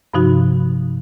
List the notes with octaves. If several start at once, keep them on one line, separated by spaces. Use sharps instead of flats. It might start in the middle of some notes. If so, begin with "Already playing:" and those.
G2 C3 F3 D#4 F#4